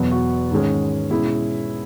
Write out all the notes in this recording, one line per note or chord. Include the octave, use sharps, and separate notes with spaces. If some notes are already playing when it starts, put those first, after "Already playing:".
Already playing: E2 B2 F#3 B3
F#4
G#2 D#3 G#3 C#4
B2 G#3 C#4 E4